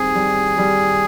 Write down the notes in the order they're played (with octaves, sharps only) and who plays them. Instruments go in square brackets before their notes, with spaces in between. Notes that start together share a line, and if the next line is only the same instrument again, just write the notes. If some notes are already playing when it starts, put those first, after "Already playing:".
Already playing: [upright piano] D#2 G3 C4 [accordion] G#4
[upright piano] G3
G3